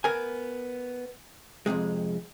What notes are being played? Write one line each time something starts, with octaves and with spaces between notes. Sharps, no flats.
B3 A#4 G#5
F2 G#2 C3 G#3